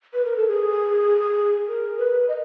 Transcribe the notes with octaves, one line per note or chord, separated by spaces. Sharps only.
B4
A#4
A4
G#4
A#4
B4
D#5